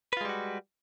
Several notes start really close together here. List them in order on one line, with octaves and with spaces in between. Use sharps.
B4 F4 G#3 G3 F#4